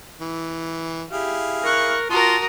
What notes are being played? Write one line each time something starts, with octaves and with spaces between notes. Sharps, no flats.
E3
E4 G4 G#4 F5
A#4 C#6 F#6
F4 F#4 A#4 A5 D#6